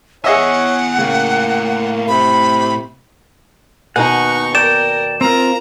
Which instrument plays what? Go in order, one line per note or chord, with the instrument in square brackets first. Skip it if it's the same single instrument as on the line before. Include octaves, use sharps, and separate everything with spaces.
[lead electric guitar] B3 G#5 [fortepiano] G#4 D#5 E5 [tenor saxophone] C#5 [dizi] F#5
[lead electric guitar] A2 G5 [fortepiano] C#3 [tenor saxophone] A#3
[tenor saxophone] C3 [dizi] B5
[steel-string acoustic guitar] D#2 B2 G#5 [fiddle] D#4 C#6 [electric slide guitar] F#5
[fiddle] A#4 [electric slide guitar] D5 G5 [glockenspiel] E7
[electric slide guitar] C4 F4 [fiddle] A#4 A#5